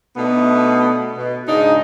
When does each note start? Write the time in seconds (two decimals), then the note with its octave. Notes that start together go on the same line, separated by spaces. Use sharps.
0.16 B2 A3 B3 D4 D#4
1.17 B2
1.48 G#2 C#3 D4 D#4